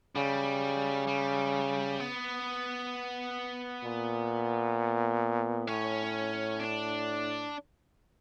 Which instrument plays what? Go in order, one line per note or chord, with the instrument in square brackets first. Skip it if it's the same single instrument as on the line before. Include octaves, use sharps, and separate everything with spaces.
[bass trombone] C#3 [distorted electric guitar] G3
[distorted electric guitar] G3
B3
[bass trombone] A#2
[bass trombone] A2 [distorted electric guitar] C#4
[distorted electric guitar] D4